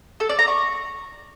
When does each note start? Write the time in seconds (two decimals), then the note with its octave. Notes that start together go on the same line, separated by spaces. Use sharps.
0.20 A4
0.29 D5
0.39 A#5
0.48 C#6